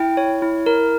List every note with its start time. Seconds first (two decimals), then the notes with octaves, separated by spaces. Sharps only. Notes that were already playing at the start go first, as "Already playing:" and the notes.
Already playing: E4 G5
0.17 C#5
0.42 E4
0.66 A#4